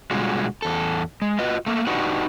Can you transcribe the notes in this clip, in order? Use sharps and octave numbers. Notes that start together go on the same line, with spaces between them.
B2 D3 G3 G#3 F4 F#4
E2 A4
G#3
F4 F#4 B4 D#5
A3 A#3
D4 D#4 F#4 G4 B4 F#5